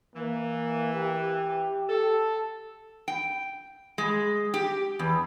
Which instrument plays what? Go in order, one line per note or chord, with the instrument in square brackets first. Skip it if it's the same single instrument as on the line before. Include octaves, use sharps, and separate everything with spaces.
[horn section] E3 [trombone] A#3
[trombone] G4
[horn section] A4
[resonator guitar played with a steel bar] G5
G#3
G4
E2